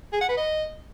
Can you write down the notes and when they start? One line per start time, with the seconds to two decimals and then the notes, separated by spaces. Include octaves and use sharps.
0.13 G#4
0.21 F#5
0.29 B4
0.37 D#5